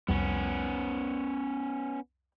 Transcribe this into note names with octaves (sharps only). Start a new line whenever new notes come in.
C2 F2 G3 B3 C#4